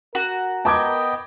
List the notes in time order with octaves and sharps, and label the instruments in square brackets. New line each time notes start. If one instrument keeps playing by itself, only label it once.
[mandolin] F#4 [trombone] A#4
[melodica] B3 D#5 G5 [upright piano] A5 D6 G#6